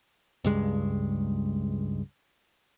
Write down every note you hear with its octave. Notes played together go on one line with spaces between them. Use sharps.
C#2 G2 G#3